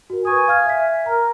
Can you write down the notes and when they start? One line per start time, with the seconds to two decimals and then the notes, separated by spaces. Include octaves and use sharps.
0.10 F#4 A#4
0.25 B4 G#5 C#6 D#6
0.48 F5 F6 G#6
0.66 E5 B6
1.06 A#4 A#5